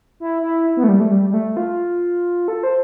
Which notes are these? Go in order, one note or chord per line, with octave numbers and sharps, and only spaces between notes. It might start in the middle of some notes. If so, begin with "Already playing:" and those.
E4
E4
B3
A3
G3
A3
G3
G3
A3
F4
A4
C5